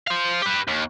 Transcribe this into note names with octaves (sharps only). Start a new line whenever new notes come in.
C5 F5
G4 B4
D#2